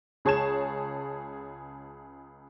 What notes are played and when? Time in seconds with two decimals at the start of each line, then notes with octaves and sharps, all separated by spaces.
0.25 C#2 G#4 C#5 A5 G#6 E7